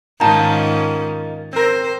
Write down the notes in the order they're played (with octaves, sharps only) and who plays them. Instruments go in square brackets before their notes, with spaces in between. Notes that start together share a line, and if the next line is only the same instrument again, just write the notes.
[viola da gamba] G#2 D#3 C#4 [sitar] A#3 D#4 F4 [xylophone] A5 A#5
[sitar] C4 A#4 [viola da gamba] C5